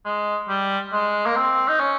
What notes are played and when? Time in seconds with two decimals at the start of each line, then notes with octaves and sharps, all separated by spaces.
0.06 G#3
0.49 G3
0.93 G#3
1.26 A#3
1.36 C4
1.69 D#4
1.80 C#4